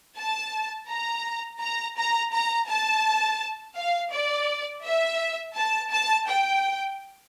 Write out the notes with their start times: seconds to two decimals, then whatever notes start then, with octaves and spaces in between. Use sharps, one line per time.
0.16 A5
0.88 A#5
1.60 A#5
1.96 A#5
2.32 A#5
2.68 A5
3.75 F5
4.12 D5
4.83 E5
5.56 A5
5.91 A5
6.28 G5